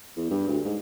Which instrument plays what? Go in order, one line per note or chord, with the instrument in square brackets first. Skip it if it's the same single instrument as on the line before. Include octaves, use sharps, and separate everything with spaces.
[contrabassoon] E2
G2
D2
G#2